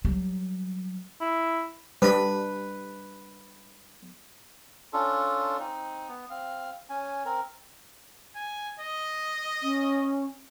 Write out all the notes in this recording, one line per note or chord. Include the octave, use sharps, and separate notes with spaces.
F#3 G3
E4
G3 D4 B4 B5
C#4 D4 F4 A4
C4 D#4
B3
C4 F5
C#4 G#5
C4 A#4
G#5
D#5
C#4